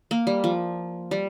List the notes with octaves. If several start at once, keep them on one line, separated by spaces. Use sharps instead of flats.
A#3
G3
F3
G3